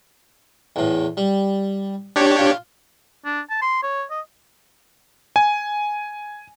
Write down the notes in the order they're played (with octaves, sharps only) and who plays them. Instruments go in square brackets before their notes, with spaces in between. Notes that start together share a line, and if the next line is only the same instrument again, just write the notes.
[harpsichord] E2 A2
G3
[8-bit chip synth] D4 G4 C#5
[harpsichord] F4
[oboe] D4
A5
C6
C#5
D#5
[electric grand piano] G#5